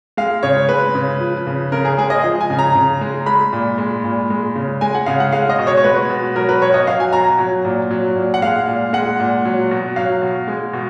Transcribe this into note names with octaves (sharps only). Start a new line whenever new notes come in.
G#3 F5
C#3 C#5
G#3 B4
C#3
F3
C#3
C#3 A#4
G#4
G#3 G#4
D#5
F3
G#5
C#3
A#5
C#3
G#3
G#3 B5
A#2
G#3
A#2
G#3
C#3
G#3 G#5
F#5
C#3 F5
F#5
G#3 F5
D#5
B2
C#5
C#5
G#3 B4
B2
F#3 A#4
B4
B2 C#5
D#5
F#3 F5
G#5
B2 A#5
F#3
A#2
F#3
A#2
F#5
G#3 F5
A#2
G#3 F#5
A#2
F#3
B2
F#3 F5
B2
G#3
B2